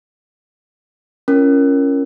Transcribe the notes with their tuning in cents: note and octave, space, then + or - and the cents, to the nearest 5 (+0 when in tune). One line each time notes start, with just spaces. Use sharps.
C#4 +0 F4 -45 A#4 +0